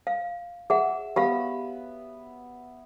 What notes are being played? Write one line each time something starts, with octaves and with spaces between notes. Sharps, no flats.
F5
G#4 E5 F#5
B3 G4 F5 B5